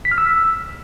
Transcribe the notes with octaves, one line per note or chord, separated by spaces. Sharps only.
B6
F6
E6